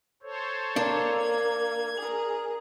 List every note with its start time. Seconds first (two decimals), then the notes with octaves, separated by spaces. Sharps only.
0.23 A4 C5 C#5
0.76 A#3 D4
1.16 G#6
1.98 G#4 A#4